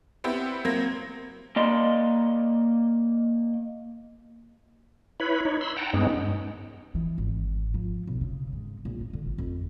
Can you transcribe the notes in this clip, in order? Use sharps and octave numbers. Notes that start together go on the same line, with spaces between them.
B3 C4 E4 G4
F#3 A#3 C4
A#3 D5 D#5 C6
E4 B4 C#5 B5
D#4 C#5
B5 C6 E6
F#5 G5 A5 A#5
G2 G#3 B3 C#4 D#4
E3
G#1
F3
B1
C#3
G#2
A#1
D#4
D3
A1
F2